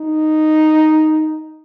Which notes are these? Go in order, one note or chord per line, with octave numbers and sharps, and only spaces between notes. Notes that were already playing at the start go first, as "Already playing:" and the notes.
Already playing: D#4